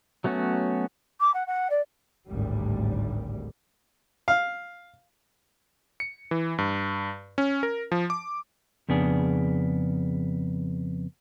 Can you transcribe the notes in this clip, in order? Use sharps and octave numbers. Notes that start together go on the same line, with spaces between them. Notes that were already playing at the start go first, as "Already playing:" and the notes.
F#3 A3 B3 C#4 F#4
D6
F#5
F#5
D5
G#1 D2 A2 G3
F5
C#7
E3
G2
C#4
A#4
F3
D6
F2 C#3 B3 D4 G#4